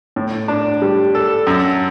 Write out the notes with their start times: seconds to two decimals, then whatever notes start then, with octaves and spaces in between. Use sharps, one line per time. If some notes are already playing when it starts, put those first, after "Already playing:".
0.16 A2
0.48 D4
0.82 G3
1.15 A4
1.47 F#2